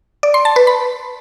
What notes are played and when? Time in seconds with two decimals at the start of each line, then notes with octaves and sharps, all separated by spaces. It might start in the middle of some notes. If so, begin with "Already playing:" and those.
0.23 D5
0.34 C6
0.45 A5
0.56 B4
0.67 B5